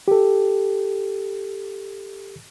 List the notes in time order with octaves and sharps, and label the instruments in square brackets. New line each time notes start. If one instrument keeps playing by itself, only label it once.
[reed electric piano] G4 A4